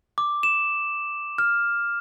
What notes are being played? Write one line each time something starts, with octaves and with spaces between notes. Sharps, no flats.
D6
E7
F6